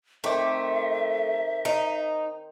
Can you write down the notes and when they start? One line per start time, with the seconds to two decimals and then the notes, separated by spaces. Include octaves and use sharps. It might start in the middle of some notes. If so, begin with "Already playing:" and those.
0.24 D#3 A3 C4 E5 D6
1.65 D#4